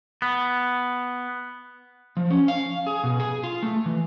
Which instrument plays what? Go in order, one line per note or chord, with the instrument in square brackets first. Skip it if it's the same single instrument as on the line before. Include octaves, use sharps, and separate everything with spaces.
[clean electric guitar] B3
[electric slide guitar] F3
C#4
F5
G#4
B2
G#4
F4
A3
E3